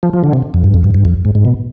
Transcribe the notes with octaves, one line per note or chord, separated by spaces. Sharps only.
F3
F3
D3
C3
F2
G2
F2
G2
G2
F2
G#2
G#2
B2